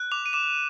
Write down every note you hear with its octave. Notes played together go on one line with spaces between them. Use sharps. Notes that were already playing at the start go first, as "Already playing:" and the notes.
Already playing: F#6
D6 F7
D#7
D6 E7